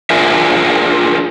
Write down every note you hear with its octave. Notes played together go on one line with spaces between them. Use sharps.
D4 F4 G#4 A#4 E5